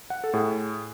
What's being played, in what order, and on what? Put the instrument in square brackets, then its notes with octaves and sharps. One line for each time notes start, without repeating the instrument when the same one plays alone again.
[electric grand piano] F#5
A4
A2 G#4